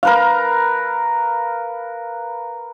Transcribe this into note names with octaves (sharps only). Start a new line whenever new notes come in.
A#4 B4 F5